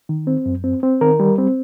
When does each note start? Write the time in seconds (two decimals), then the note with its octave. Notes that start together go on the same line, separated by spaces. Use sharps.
0.09 D#3
0.27 C4
0.46 F#2
0.64 C4
0.83 C4
1.01 D#3 A#4
1.20 G3
1.38 C4